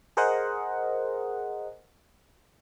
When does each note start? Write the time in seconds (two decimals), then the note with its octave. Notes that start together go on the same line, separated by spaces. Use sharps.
0.17 G#4 A#4 C5 D#5 F#5